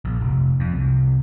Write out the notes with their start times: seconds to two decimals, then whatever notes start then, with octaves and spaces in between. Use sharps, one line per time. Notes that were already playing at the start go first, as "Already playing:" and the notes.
0.05 A#1
0.21 F1
0.60 F2
0.72 C2